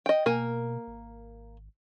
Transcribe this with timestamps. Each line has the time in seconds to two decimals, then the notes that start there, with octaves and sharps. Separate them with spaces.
0.06 D#5 G5
0.26 B2 A#3 A#4 G#5
0.87 G#1